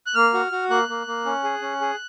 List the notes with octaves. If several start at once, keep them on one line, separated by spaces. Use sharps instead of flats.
F#6
A#3 F6
F#4
F#4
A#3 F#6
A#3
A#3
C#4
G#4
C#4
G#4